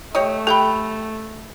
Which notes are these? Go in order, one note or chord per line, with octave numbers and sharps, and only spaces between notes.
A3 G4 C#5 D#5
G4 A4 G5 B5